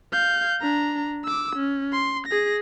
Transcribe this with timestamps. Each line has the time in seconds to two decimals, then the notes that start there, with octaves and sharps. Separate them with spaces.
0.12 F5 G6
0.61 D4 A#5
1.24 D6 E6
1.56 C#4
1.92 C6
2.27 G#4 A#6